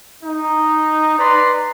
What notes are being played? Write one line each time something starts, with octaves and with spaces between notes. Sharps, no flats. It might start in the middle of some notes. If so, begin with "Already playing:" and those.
D#4
B4 D5 A#5 C6